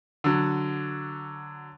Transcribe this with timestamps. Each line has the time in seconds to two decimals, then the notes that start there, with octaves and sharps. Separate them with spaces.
0.24 D3 F#3